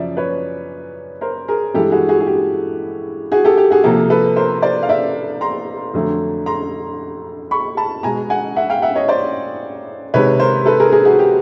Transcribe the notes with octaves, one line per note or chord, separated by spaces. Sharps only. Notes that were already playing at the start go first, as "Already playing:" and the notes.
Already playing: F#2 C#3 F3 D5 E5
B4 C#5
A#4 C5
G#4 A#4
G2 E3 G#3 G4 A4
F#4 G#4
F#4 G#4
G#4
G4
F#4 G#4
G4 A4
G4
F#4 G#4
C3 F3 A#3 G4 A4
A4 B4
A#4 C5
C5 D5
F5
D5 E5
A#5 C6
F2 D3 F#3 A3
A#5 C6
B5 C#6
A5 B5
B2 G#3 G#5 A#5
F#5 G#5
E5 F#5
F5 G5
E5 F#5
C#5 D#5
C5 D5
C3 D#3 G#3 B4 C#5
A#4 C5
A4 B4
G#4 A#4
G#4 A#4
F#4 G#4
G4